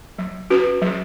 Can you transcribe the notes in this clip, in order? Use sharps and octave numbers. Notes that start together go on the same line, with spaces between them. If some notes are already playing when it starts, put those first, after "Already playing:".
F#3
C#4 F#4 B4
F#3